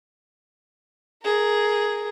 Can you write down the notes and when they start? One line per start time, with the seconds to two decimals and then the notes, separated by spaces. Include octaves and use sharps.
1.23 G#4 A#4